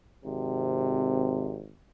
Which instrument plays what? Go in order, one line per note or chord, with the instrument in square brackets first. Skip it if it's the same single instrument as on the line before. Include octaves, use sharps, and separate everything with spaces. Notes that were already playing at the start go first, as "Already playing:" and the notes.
[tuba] G#1 [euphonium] C3